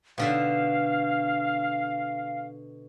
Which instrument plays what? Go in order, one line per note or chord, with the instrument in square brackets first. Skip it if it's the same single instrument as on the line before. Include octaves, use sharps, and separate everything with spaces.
[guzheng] B2 D3 E5 [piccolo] F5